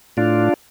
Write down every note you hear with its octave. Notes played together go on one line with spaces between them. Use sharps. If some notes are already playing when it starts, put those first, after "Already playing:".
A2 D4 F4